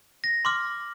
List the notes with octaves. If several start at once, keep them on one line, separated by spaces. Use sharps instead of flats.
A#6
C6 D6 F6